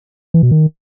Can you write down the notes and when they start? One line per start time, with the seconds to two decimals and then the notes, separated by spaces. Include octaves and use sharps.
0.34 E3
0.43 B2
0.51 D#3